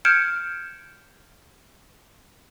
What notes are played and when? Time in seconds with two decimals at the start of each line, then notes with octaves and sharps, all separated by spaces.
0.05 F6 G6 G#6 C#7 D7 E7